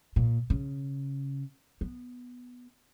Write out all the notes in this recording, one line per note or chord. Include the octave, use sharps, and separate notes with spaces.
A#2
C#3
B3